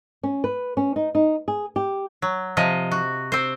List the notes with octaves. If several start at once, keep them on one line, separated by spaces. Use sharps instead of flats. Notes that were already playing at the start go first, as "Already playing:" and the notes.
C#4
B4
C#4
D#4
D#4
G#4
G4
F#3
C3 F3 D#5
F#4
C4 C5